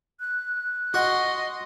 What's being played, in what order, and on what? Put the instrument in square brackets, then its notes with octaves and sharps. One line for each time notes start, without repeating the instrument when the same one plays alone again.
[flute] F#6
[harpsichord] F#4 [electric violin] D#5 C6